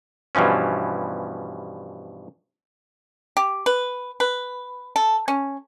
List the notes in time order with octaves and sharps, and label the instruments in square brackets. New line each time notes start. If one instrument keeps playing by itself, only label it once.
[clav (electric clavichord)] G2 B2 E3 F3 C#4
[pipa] G4
B4
B4
A4
C#4